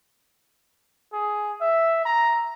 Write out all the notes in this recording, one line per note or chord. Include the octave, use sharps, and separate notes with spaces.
G#4
E5
A#5